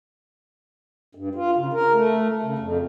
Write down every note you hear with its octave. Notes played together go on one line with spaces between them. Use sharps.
G2
F4
C#3
A#4
A3
C#3
F2